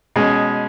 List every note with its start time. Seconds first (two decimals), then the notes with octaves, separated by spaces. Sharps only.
0.16 B2 G#3 C#4 G#4